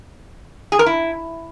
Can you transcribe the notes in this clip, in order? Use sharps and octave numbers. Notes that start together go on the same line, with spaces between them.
G#4
A#4
E4